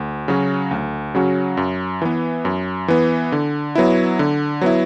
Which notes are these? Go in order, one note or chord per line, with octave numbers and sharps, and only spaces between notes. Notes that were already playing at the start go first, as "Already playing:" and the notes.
Already playing: D2
C#3 F#3 C#4 F#4
D2
C#3 F#3 C#4 F#4
F#2
E3 B3
F#2
E3 B3
D3
F#3 B3 E4
D3
F#3 B3 E4